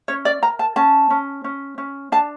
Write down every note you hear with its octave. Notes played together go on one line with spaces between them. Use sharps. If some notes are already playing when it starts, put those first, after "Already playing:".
C#4 C#5
D5
A#4 A#5
A5
C#4 A5
C#4
C#4
C#4
D4 A5